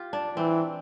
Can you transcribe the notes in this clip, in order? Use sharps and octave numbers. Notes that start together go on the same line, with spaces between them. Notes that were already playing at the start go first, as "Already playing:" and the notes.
Already playing: F4 G4
D4
E3 C4